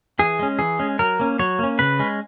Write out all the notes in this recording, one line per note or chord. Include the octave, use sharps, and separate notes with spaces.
E3 G#4
G#3 C#4
E3 G#4
G#3 C#4
F#3 A#4
A#3 C#4
F#3 C#5
A#3 C#4
C#3 B4
G#3 C#4